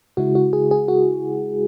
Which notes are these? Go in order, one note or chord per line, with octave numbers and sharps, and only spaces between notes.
C#3 G#3 E4 F#4
F#4
G#4
G#4
F#4